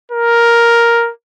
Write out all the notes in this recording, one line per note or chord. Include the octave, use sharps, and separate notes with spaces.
A#4